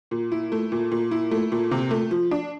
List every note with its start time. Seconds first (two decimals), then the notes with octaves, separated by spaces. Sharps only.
0.11 A#2
0.32 E4
0.52 A3
0.72 A#2
0.92 A#2
1.11 E4
1.31 A3
1.52 A#2
1.71 C3
1.91 A3
2.11 F3
2.31 D4